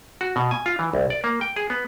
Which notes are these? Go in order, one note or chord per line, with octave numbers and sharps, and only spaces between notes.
F#4
B2
G#5
F4
E3
C2
D5
A#3
G5
G#4
B3